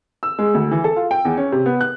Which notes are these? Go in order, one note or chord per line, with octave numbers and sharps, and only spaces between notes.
E6
G#3
D2
E3
A4
F4
G5
E2
C#4
C3
B3
F#6